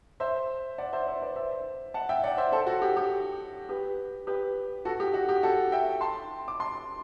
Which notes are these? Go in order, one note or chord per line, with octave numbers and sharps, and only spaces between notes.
C5 E5
D5 F#5
C5 E5
C5 E5
B4 D5
C5 E5
F#5 A5
E5 G5
D5 F#5
C5 E5
A4 C5
F#4 A4
G4
G4
G4 B4
G4 B4
F#4 A4
G4
F#4
G4
F#4 A4
E5 G5
A5 C6
D6
A5 C6